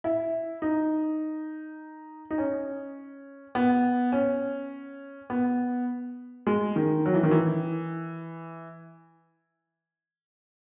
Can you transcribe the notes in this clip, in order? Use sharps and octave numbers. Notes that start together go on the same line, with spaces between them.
E4
D#4
D#4
C#4
B3
C#4
B3
G#3
D#3
F#3
E3
D#3
E3